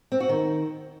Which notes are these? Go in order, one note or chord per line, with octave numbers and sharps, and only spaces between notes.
C4
F#4
D#3